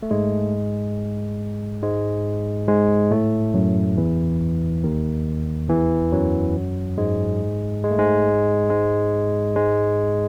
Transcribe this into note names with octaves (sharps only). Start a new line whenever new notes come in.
A3
G#2 G#3
G#2 G#3
G#2 G#3
A2 A3
F#2 F#3
E2 E3
D#2 D#3
E2 E3
F#2 F#3
G#2 G#3
G#3
A3
G#2 G#3
G#2 G#3
G#2 G#3